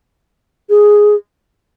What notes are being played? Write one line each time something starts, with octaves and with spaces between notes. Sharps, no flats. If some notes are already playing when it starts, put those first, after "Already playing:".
G#4